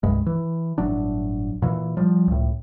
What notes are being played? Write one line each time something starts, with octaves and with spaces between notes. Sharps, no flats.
C2 G2 G#3
E3
G1 A2 F#3 D4
A#2 E3
F3 G3
C#2 A2